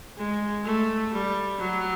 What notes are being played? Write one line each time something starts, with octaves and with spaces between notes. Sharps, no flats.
G#3
A3
G3
F#3